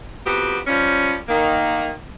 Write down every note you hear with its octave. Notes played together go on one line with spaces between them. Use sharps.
F2 B3 F#4 G4
F3 G3 C#4
D#3 A#3